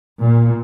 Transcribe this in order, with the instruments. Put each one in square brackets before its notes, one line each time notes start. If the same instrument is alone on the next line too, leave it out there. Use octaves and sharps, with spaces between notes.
[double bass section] A#2